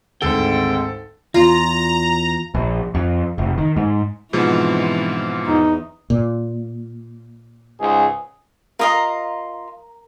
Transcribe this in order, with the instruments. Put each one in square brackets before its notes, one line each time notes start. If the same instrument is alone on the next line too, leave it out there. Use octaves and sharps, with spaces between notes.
[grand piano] G#1 D2 [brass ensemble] D#3 G#3 C4 [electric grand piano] A4 [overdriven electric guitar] G5
[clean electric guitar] E2 [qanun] F4 [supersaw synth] A#5
[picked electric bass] A#1
F2
F1
D#3
G#2
[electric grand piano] G#2 B2 F3 [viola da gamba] E3 C4 D4
[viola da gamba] E2 [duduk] D#4
[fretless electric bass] A#2
[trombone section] C#2 G#2 G#4
[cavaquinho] F4 D#5 F5 [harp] A#4 A#5